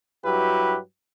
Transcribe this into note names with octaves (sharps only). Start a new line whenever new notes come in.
G2 F#3 E4 F#4 G4 B4